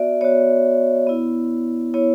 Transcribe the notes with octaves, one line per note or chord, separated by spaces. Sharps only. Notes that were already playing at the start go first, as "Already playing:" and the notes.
Already playing: B3 F#4 D5 E5
B3 F#4 C#5
B3 E4
B3 E4 C#5